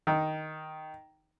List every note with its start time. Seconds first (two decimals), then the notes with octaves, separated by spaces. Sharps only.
0.07 D#3